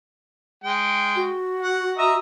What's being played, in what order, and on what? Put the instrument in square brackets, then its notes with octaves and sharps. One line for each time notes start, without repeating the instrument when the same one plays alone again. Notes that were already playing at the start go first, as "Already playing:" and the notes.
[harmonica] G#3 G5
[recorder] F#4
[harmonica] F#5
D#5 E5 A#5